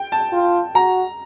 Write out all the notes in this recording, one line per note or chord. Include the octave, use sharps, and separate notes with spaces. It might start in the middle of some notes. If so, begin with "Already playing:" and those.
Already playing: G5
A5
F4
F#4 A#5